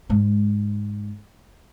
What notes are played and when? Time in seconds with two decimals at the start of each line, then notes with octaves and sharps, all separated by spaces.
0.10 G#2 G#3